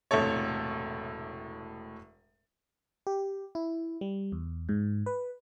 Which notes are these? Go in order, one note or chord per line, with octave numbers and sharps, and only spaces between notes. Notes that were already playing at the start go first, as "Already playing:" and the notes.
E1 A2 C3 A4 C#5
G4
E4
G3
E2
G#2
B4